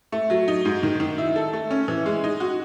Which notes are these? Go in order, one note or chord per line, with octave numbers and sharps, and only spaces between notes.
A3
F#3
D#4
G#2
D#3
D#3
E4
A4
A3
C#4
E3
G#3
D#4
F#4